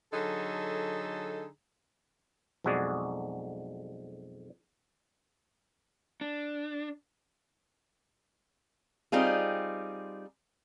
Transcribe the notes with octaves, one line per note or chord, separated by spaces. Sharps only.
D3 F#3 D#4 G#4 A4
B1 F2 G#3 F#4 G#4 D5
D4
G3 C4 D#4 F4 G#4